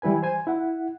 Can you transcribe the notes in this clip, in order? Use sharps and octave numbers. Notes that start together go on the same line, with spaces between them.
E3 G3 E4 B4 G#5
C5 G#5
E4 F#5